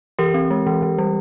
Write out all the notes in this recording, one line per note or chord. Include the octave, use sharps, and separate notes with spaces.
E3 G4 A#4
C4
G#3
E3
E3
G3